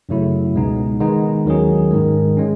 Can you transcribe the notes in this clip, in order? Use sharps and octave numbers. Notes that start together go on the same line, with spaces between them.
F#2 C#3 F#3 A3 E4
C#2 B2 G#3 B3 D#4
D#3 G#3 B3 D#4
D#2 D#3 F#3 C#4 G#4
G#2 D#3 G#3
G#3 C#4